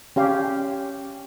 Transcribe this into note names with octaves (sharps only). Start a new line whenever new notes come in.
C#4 G4 F5